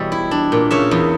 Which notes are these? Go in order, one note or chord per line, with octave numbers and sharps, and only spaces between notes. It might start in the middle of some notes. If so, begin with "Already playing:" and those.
Already playing: E2 B2 G3 C#5 E5
E4
D4
A#2
C#3 C#5 E5
E2